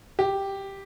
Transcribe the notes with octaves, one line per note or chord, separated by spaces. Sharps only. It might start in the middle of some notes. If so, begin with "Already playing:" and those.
G4